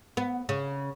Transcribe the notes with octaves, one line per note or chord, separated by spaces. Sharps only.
B3
C#3